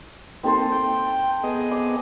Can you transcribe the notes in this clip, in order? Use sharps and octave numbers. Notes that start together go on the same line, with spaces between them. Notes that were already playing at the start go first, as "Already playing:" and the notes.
A#3 C4 D#4 A4 C5
G5
B3 G#4 D#5
D6